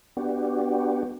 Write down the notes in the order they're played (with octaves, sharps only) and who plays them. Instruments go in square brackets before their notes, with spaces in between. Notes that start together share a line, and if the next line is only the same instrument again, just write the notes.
[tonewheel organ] B3 D4 F#4 G4